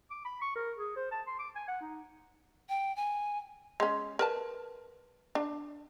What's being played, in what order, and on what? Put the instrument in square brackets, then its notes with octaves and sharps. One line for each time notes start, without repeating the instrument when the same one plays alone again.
[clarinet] D6
B5
C#6
A#4
G#4
C5
A5
C6
D6
G#5
F#5
D#4
[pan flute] G5
G#5
[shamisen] G#3 C#4
A#4 B4 A5
D4